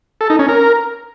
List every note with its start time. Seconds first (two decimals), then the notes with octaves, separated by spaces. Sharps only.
0.21 A4
0.30 D#4
0.39 C#4
0.48 A#4